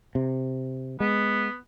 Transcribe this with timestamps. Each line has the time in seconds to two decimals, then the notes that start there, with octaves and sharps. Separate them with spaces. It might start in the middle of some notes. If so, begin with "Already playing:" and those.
0.15 C3
1.00 G#3 B3